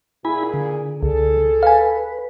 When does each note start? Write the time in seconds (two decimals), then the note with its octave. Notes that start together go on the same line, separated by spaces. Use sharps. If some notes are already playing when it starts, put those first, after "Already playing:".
0.25 A#2 E4 G#4 G#5 B5
0.54 D3
1.03 C#2 G#4 A4
1.63 B4 F5 G#5